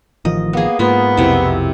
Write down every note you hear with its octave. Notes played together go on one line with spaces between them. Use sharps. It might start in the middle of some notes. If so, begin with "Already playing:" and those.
A1 D#3 F3 D#5
A#3 B3 G#4
G#2 A#3 B3 F4
B1 F2 C3 E4